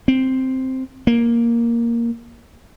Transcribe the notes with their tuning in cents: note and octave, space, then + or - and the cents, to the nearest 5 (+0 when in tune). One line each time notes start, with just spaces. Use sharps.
C4 +0
A#3 +5